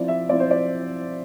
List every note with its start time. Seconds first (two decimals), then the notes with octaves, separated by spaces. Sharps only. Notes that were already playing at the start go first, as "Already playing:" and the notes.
Already playing: F3 C4 E4 D5
0.08 E5
0.29 F3 C4 E4 D5
0.40 C5
0.51 D5